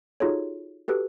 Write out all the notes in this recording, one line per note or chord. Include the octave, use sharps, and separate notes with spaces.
D#4 F4 F#4 G#4 A4 C#5
F#4 G4 A4 B4